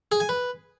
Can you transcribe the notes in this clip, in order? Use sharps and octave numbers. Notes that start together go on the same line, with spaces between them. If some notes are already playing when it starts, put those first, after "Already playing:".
G#4
G#5
B4